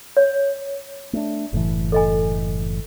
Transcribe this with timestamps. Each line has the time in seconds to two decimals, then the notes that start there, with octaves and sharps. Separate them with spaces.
0.17 C#5
1.13 A3 C#4 D4
1.53 F#1 A2 E3
1.92 A4 D#5 G#5